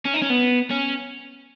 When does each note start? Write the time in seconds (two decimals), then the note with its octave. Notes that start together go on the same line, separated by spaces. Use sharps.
0.06 C#4
0.14 D#4
0.22 C#4
0.30 B3
0.71 C#4